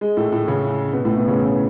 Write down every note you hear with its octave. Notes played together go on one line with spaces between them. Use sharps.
G#3
A2 A3
A2 A3
C#3 C#4
B2 B3
A2 A3
B2 B3
C#3 C#4
E3 E4